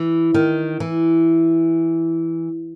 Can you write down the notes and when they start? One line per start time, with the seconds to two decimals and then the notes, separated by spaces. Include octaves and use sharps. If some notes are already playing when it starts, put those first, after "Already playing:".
Already playing: E3
0.34 D#3
0.80 E3